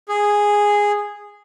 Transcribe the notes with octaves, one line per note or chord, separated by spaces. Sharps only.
G#4